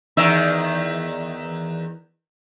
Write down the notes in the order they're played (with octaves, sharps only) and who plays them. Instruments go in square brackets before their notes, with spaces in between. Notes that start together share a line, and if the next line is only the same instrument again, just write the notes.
[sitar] E2 D#3 E5